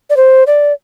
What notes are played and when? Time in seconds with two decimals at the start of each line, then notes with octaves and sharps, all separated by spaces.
0.10 D5
0.16 C5
0.47 D5